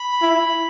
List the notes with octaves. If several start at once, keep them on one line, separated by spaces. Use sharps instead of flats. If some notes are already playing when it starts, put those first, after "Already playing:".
Already playing: B5
E4